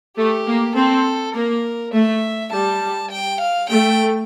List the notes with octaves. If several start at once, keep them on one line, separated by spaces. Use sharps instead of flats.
A3 G4
A#3
C4 A4
A#3 A#4
A3 E5
G3 A5
G5
F5
A3 G5